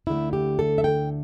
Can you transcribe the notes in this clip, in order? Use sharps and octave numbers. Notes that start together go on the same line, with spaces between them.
D2 D3 A3 E4
G4
A4
E5
G5